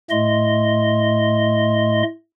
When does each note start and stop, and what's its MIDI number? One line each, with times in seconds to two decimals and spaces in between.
0.10 2.03 45
0.10 2.03 57
0.10 2.03 75
0.10 2.03 84